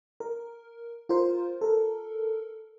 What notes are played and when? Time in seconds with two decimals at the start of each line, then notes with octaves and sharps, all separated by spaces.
0.20 A#4
1.09 F4 A#4 C5
1.61 A4 A#4